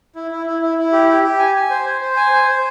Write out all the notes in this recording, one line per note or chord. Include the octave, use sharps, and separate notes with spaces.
E4
E4
E4
E4
E4
G4
G4
G4
G#5
G#5
C5
C5
C5
G#5
C5
C5